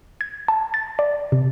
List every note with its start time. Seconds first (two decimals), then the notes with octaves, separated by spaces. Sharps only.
0.21 G#6
0.48 A5
0.74 A6
0.99 D5
1.32 C3